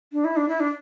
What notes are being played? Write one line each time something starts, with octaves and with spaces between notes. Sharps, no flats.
D4
E4
D4
E4
D4